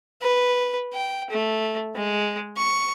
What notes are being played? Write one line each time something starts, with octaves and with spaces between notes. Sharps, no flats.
B4
G5
A3
G#3
C#6